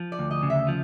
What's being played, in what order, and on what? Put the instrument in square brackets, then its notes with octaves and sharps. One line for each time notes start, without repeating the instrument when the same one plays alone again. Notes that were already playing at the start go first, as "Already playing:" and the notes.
Already playing: [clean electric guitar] F3
[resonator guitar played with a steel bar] D5
[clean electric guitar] D2
[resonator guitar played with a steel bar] D#5
[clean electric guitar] C#3
[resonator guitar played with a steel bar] E5
[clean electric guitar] F3